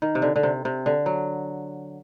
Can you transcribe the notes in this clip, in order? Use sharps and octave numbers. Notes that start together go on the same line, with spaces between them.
D#3
C3
D3
D3
C3
C3
D3
F#3